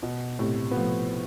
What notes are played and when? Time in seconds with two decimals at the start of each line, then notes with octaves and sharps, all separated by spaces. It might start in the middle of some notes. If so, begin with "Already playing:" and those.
0.03 B2
0.39 A2 C3
0.71 B3
0.75 F3 A3